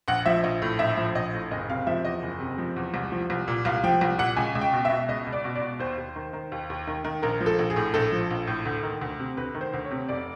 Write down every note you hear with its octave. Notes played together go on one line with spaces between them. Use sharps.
A#1 F#5
F3 E5
A#1 D#5
A2
A#1 E5
F3
A#1 D#5
A2
F#1 D#5
C3 F5
F3 E5
E2 D#5
F#1
C3
F3
E2
C2
F3
C2
A#2
C2 F5
F3 G5
C2
A#2 F#5
C#2 G#5
C#2
G5
B2
E5
B2
C#2 D#5
C#2
D5
B2
D5
B2
D#2 C5
D#2
D#3
D#3
D#2
D#2
D#3
D#3
A#1 A#4
F3
A4
A#1
G#4
A2
A#1 A4
F3
A#1
A2
D2
D#3
D2
C3
D2 B4
D#3
C5
D2
C#5
C3
F1 D5